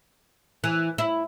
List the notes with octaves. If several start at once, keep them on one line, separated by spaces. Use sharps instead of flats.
E3
E4